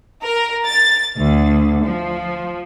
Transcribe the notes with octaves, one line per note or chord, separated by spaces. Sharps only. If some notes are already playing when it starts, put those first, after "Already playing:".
A#4
A6
D2
F3